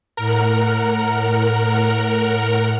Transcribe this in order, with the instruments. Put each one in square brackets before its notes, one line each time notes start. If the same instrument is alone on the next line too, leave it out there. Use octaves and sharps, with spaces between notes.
[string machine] A2 F#5 F6 [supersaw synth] A#4